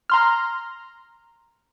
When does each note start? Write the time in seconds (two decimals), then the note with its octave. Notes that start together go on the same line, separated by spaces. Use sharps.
0.10 A#5 C6 F6